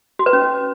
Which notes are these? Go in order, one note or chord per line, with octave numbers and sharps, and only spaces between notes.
F#4
B4
C#4